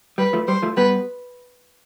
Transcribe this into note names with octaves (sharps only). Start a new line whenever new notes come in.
G3 B4
F3 A3
G3 C5
F3 A3
G3 B3 B4